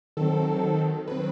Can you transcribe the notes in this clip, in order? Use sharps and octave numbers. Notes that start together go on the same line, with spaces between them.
D#3 F#3 C4 A4
D#3 F#3 C4 B4